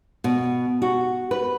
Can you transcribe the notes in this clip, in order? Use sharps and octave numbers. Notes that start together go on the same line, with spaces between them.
B2
F#4
B4